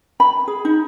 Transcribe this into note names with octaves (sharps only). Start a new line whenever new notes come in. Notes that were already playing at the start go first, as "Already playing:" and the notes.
B5
G#4
D#4